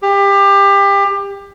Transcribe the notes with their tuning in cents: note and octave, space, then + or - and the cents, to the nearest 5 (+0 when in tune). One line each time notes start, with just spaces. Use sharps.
G4 +25